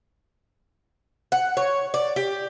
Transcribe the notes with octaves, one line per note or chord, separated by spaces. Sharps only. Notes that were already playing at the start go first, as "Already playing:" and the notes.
F#5
C#5
D5
G4